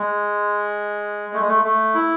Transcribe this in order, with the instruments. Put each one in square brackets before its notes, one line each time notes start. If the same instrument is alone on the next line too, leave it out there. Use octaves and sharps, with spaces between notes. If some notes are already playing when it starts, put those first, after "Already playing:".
Already playing: [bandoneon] G#3
A3
G#3
A3
A3
E4